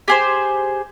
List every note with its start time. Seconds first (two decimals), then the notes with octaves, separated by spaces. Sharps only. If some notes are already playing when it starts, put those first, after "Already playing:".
0.08 G4 G#4 C5